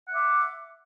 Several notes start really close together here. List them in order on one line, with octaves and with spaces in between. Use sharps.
F#5 E5 D6